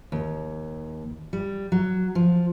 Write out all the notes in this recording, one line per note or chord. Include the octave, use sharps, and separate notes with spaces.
D#2
G3
F#3
F3